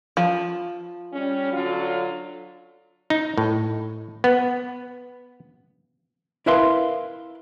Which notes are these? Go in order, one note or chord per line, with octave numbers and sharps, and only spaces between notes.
F3
G3 C#4
D3 F#3 F4
D#4
A2
B3
E4 A#4 B4 E5 F5 C6